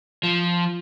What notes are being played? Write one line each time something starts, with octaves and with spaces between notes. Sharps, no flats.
F3